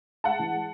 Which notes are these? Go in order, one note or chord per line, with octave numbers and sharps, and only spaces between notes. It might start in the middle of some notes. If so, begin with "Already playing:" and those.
G#3 F#5 A5
E3
G#3